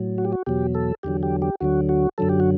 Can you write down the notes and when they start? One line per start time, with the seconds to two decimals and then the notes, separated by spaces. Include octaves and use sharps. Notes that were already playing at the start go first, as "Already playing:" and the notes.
Already playing: A2 F#3
0.18 F#4
0.25 G4
0.33 F#4
0.46 E2 B2 F#3 G4
0.75 A4
1.03 E2 D3 F#3 G4
1.23 G4
1.42 G4
1.61 D2 D3 F#3 F#4
1.89 F#4
2.18 F#2 D3 F#3 A4
2.29 G4
2.40 F#4